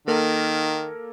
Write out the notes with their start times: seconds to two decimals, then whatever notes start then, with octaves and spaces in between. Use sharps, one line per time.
0.08 D#3 A#3 A4 A#4